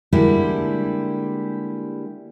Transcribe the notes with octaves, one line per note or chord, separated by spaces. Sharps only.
D3 G3 G#3 A#3 E4 G4